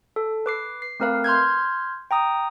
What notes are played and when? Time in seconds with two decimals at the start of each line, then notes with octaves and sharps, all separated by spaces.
0.16 A4
0.46 B4 D6 C7
0.82 C7
1.00 A3 C4 A#4 B4 F5
1.24 C6 F6 G6 G#6
2.11 G5 A#5 D#6